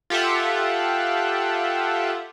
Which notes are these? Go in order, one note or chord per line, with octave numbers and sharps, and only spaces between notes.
F4 G4 A4 E5 F#5